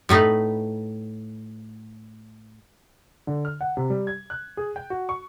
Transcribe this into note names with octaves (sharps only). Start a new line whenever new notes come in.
A2 A3 D#4 B4
D3
F6
F#5
C3
G3
G#6
F#6
G#4
G5
F#4
C#6